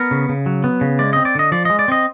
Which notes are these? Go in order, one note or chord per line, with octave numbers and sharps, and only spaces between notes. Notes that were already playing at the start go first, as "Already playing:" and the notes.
Already playing: B3 A#4
C#3
C#3
F#3
B3
C#3
G#3 D5
C4 D#5
D5
D3 D#5
F3 D5
G#3 D#5
D5
C4 D#5